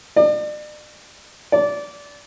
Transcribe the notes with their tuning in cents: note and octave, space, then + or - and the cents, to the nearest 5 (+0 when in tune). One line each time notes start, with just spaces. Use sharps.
D5 +40
D5 -20